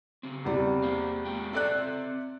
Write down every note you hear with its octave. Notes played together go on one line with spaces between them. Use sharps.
C#3 C4
E2 C3 G3
A#3 C5 F5
A#2 G#3 G5
C4 A4 D5 E5 F#6